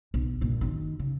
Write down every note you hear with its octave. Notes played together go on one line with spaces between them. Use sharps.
B1
G2 A#2
F#2 D#3
C#3